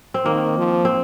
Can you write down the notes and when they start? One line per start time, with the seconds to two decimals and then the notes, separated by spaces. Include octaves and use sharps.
0.14 C4
0.25 D#3 A#3
0.58 F3
0.85 C4